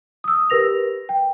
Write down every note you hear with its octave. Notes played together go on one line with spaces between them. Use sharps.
D#6 E6
G4 A#4 B4 A#6 F7
G5